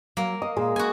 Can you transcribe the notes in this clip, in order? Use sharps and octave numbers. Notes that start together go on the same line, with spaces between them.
F#3 A#3
D#5 D#6
A#2 G#3
A#3 F#4 G#5